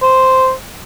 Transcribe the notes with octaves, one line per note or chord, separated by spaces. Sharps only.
C5